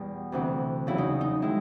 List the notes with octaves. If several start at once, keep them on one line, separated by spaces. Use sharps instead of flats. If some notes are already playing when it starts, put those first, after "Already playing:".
Already playing: E2 B2 G3
D2 C3 E3
E2 C#3 F#3 E4
D#4
D#4
D#3 G#3 E4